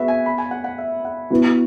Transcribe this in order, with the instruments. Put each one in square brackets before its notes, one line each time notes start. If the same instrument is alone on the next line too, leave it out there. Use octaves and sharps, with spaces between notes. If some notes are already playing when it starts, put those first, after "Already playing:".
Already playing: [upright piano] B3 [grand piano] F#4 G#4 B4 E5
[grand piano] G#5
B5
G#5
F#5
F#5
E5
F#5
[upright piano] B3 E4 B4 [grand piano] F#4
[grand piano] F#4